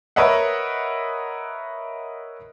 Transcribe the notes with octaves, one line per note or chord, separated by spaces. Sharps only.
A#4 B4 C#5 D#5 E5 F#5